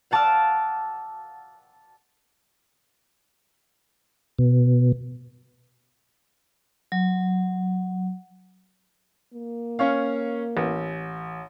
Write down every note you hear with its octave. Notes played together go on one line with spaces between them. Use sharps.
F5 F#5 A5 D6 E6 F6
B2
F#3
A#3
C#4 C#5 F5
A1